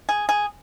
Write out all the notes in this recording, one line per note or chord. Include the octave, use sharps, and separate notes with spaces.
G#4
G#4